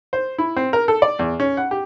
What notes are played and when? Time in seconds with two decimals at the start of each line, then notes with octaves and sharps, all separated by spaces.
0.13 C5
0.38 E4
0.56 C4
0.73 A#4
0.88 A4
1.02 D5
1.19 E2
1.40 C#4
1.57 F#5
1.71 G4